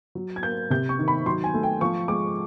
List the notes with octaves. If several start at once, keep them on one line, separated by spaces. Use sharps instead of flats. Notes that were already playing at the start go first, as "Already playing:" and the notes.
F#3
G#6
A#3 G6
C3 G6
C#6
D#3
B5
F#3 C6
G#5
A3
G5
F3 C#6
G#3 D6